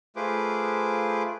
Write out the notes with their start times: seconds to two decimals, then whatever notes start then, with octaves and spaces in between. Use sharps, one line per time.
0.16 A3 F4 G#4 B4 C5 D6